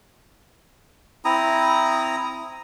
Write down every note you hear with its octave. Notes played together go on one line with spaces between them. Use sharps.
C4 E4 A#5 D#6